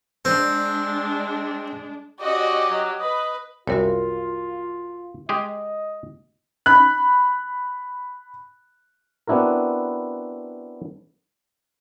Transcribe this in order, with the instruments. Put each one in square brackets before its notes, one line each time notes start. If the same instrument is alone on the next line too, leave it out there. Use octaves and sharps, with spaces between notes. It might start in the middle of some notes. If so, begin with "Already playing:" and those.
[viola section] G#3 D4 [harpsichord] C4
[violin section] C#4 F#4 D#5 [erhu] G4 [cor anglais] D5
[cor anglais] F#3
[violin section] B4 [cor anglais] D#5
[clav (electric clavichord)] C2 F#2 [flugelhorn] F4 [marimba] F#4 A#4 C#5
[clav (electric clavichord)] G#3 G4 G#4 [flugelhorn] D#5
[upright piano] B5 F#6
[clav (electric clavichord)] B3 C4 D4 E4 F#4 A#4